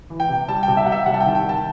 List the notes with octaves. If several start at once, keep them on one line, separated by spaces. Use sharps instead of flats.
E3
G5
C3
G3 A5
G5
C3
E5
C3 F#5
E5
G3 F#5
A5
G5
D#3
G5
D#3 A5